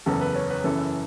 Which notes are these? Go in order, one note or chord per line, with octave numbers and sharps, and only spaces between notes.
F#1 E2 C#3 A4
B4
C#5
B4
F#1 F#2 C#3 E3 A4